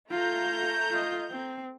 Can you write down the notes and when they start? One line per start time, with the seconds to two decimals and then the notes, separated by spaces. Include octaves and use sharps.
0.11 A3 F4 A#5 G6
0.91 F4 D#5
1.31 C4